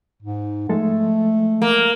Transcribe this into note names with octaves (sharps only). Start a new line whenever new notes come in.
G#2
F3 G#3 A3 A4
A#3